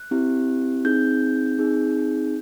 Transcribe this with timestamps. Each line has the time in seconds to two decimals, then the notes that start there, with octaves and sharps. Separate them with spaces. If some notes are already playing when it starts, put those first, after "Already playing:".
Already playing: F#6
0.11 C4 E4 G4
0.84 C4 D#4 G#4 G6
1.58 C4 D#4 G#4